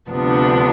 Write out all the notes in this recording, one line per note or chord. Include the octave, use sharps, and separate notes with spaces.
D2 C3 F3 B3 D4